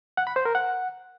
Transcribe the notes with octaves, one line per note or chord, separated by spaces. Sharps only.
F#5
B5
C5
A#4
F#5